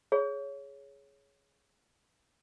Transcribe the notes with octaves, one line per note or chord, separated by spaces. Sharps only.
G#4 C#5